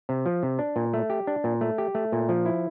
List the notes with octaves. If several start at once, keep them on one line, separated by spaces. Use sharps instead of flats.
C3
F3
C3
D4
A#2
A3
G4
D4
A#2
A3
G4
A3
A#2
F3
E4